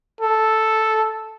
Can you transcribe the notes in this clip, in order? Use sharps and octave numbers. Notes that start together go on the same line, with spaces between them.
A4